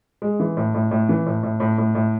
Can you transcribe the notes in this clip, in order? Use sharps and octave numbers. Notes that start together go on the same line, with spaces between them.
G#3
E3
A2
A2
A2
E3
A2
A2
A2
A2
A2